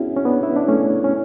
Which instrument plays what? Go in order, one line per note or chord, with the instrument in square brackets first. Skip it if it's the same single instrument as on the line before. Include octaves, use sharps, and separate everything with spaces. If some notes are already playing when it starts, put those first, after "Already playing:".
Already playing: [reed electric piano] B3 C#4 D4 E4 F#4 G#4
C#4
B3 D4
E4
D4
A3 C#4
C#4